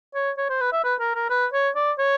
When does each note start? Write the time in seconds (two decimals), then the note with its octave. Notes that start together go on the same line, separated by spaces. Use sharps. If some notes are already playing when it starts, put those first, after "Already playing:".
0.15 C#5
0.37 C#5
0.50 C5
0.61 B4
0.73 E5
0.84 B4
1.00 A#4
1.15 A#4
1.30 B4
1.53 C#5
1.75 D5
1.99 C#5